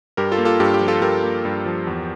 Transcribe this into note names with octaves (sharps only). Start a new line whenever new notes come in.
G2 G4 A#4
F4 A4
A#3
F4 A4
G2 G4
G4
F3
F4 A4
G2 G4 A#4
A#3
G2
F3
E2